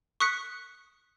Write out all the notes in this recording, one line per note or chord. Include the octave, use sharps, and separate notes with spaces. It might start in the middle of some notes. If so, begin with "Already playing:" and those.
C#6 D#6 F#6 B6 C#7